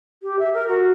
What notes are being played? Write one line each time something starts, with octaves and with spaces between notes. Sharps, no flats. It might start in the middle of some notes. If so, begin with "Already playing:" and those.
G4
E5
A#4
F#4